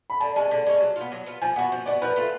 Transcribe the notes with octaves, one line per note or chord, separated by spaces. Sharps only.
B5
D3 A5
G#3 C#4 A5
D3
G#3 C#4
F#3
B3 F4
F#3
B3 F4
F3 G#5
B3 F#4 F#5
F3
B3 F#4 D5
F3 B4
A3 F4 A4